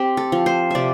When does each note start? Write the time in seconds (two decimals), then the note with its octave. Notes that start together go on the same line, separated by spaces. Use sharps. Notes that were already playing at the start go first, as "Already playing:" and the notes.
Already playing: C4 G4
0.17 A4
0.32 F3
0.46 C5
0.71 C3 D5 E5